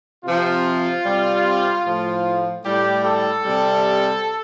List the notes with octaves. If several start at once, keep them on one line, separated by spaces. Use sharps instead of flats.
C3 F3 F4
C3 G3
A2 F3
A2 G3 G4
A4
C3 G3